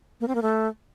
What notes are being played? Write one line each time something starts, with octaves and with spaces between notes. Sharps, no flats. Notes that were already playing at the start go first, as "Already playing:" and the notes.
A#3
C4
A#3
A3